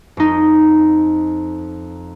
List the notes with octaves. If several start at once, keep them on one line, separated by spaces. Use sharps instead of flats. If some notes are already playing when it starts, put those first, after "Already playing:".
F2 D#4